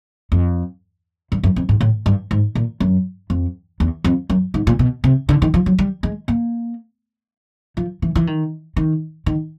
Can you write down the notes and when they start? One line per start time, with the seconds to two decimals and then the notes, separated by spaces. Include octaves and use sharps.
0.32 F2
1.32 G2
1.43 F#2
1.56 F2
1.69 G#2
1.81 A2
2.06 G2
2.31 G#2
2.55 A#2
2.80 F#2
3.30 F2
3.80 E2
4.04 F2
4.30 F#2
4.54 G#2
4.67 A#2
4.79 B2
5.04 C3
5.29 D3
5.42 D#3
5.54 F3
5.66 F#3
5.79 G3
6.03 G#3
6.28 A#3
7.77 F3
8.02 E3
8.15 E3
8.27 D#3
8.77 D#3
9.26 D#3